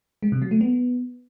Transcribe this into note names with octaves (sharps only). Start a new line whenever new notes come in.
G#3
C3
F#3
A3
B3